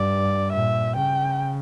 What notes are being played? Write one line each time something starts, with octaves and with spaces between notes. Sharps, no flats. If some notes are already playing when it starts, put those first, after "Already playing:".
Already playing: G2 D5
A#2 E5
C#3 G5